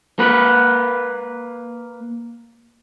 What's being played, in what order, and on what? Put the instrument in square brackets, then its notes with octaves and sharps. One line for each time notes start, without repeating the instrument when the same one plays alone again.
[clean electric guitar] A#3 B4